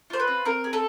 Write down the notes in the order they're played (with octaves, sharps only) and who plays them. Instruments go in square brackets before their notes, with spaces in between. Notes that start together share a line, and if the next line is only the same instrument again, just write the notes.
[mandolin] F4 C5
B4
C4
C4 A#4
G#4
A4